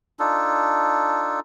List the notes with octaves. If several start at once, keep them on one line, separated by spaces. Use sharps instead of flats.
D4 D#4 F4 A4